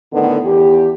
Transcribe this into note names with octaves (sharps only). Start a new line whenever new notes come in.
A2 D3 D#3 B3
E2 G4